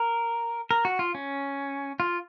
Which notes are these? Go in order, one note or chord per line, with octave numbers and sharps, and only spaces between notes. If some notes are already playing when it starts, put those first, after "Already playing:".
Already playing: A#4
A#4
F#4
F4
C#4
F4